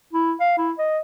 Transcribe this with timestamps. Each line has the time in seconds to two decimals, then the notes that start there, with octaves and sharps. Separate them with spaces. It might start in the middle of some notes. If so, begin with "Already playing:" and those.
0.13 E4
0.40 F5
0.58 E4
0.78 D#5